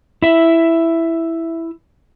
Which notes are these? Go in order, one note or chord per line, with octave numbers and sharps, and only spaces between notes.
E4 E5